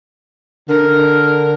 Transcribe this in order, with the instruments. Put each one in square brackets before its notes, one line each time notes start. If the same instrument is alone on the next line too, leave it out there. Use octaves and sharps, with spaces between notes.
[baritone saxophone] D3 [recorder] A#4